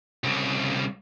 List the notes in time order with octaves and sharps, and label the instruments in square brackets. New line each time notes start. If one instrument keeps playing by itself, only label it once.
[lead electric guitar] C2 C#3